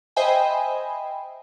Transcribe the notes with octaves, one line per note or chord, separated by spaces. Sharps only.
C5 D#5 E5 G5 G#5 B5